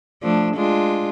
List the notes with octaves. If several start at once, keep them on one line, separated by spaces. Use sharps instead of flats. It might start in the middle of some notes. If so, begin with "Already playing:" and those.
F3 A3 D4
G#3 D4 F4